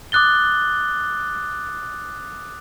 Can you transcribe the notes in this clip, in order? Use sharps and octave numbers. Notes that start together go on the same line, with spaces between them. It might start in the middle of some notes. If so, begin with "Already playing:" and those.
D6 D#6 F#6 A6 G7